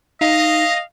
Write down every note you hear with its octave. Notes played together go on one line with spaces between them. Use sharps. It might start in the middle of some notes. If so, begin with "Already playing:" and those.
D#4 D#5 F5